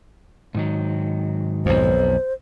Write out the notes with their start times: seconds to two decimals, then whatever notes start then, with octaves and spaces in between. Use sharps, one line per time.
0.55 G#2 D#3 F#3
1.66 B1 F2 C5